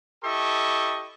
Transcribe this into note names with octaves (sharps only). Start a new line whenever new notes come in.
E4 G4 A4 D#5 C#6